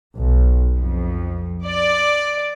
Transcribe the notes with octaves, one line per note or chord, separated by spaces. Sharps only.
B1
F2
D5